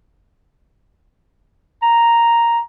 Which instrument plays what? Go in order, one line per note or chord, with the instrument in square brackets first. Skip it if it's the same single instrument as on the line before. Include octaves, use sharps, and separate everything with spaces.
[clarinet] A#5